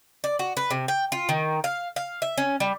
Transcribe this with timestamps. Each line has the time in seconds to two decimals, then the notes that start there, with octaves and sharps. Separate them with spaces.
0.24 D5
0.39 F#4
0.57 B4
0.70 C3
0.88 G5
1.12 F4
1.29 D#3
1.64 F5
1.96 F5
2.22 E5
2.38 C#4
2.60 G3